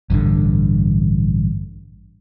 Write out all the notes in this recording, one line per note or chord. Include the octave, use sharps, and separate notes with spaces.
A1 G2 B2 D3